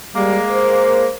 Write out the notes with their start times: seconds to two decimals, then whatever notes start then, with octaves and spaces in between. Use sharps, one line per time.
0.16 G3 G#3 A#3
0.51 C5